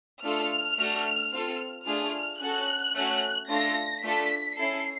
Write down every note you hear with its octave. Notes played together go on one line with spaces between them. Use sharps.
A3 D4 F4 A4 F6
A3 D4 F#4 A4
C4 F4 A4
A3 D4 F4 G#4 F6
C#4 F#4 A4 F#6
A3 C#4 F#4
A3 D4 F4 A4 A#6
A3 D4 F4 A4 B6
C#4 E4 A4 C7